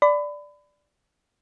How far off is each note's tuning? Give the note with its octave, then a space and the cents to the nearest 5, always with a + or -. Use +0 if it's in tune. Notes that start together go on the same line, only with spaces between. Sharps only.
D5 +0 B5 +30